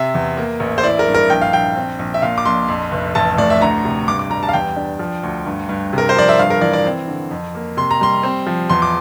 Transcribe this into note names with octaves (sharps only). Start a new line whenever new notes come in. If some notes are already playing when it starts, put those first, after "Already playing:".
Already playing: C3 E5
E2
A#3
A1
C5
E4 D5
A#4
G2
A#4
A#1 G5
F5
A#1 G5
C4
A#1
E5
A#2 F5
D6
A#1 C6
F2
F1
A1 A5
A2 D5
E5
D2 A#5
C3
G2 D6
D6
G3 A#5
A5
F5
E2 G5
D4
F3
D2
G2
G2
C3 A#4
C5
F3 D5
E5
G2 F5
A#4
E3 D5
D5
C4
D3
F2
A#3
C3 C6
A#5
G3 C6
C4
F3
E2 C6
D6